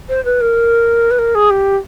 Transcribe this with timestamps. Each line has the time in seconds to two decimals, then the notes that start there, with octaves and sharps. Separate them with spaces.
0.09 C5
0.25 B4
0.41 A#4
1.11 B4
1.18 A#4
1.35 G#4
1.50 G4